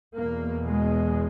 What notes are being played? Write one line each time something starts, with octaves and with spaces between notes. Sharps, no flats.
E2 B2 A#3
G#3